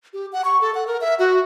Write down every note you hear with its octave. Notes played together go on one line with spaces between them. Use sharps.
G4
F#5
C#6
A4
F#5
A#4
E5
F#4